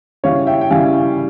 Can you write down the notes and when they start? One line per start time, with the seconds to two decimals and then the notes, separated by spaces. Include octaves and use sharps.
0.23 C#3 G3 C#4 E4 C#5 F5
0.47 E5 G5
0.61 G5
0.71 C#3 G3 C#4 E4 F5 G#5